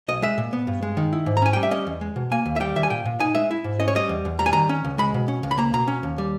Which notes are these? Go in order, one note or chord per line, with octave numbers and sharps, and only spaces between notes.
B1 D#5
G#3 E5
A#2
B3
G2
G#3
D#3
E4
G#2
A#5
C#4 G#5
G3 G5
E5
C#4 D#5
E2
G#3
B2
A#3 G#5
D#2
E5
G3 G5
D#3 E5
G#5
A#2 G5
A#2
D#4 G#5
G#3 E5
E4
G#2
C#4 D#5
C#5
G3 D#5
E2
E2
G3 A#5
G#5
D#3 A#5
C#4
C#2
G#3 B5
B2
C#4
C#2
B5
A#3 A#5
B2 A#5
C#4
D#2
G3